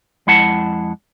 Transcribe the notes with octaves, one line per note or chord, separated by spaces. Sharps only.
F2 G#3 E4 F#5 A5